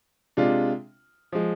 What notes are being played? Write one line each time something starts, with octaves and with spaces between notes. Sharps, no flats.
C3 G#3 D4 F4
F3 G#3